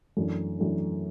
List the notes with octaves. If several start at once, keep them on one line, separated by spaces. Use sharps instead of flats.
F#2 E3 A3 D4
F#2 E3 A3 D4